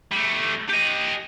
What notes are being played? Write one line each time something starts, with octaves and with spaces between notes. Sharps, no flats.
G3 A3
G4 D#5